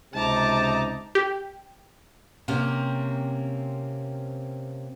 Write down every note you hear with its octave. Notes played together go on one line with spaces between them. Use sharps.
C#2 C3 D#4 A5 A#5 D6
G4
C3 A#3 C4 C#4